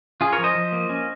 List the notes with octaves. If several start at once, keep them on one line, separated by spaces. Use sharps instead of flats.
C#4 F4 G#4
A#4 C#5
F3
C5 D#5
F3
A#3
C#4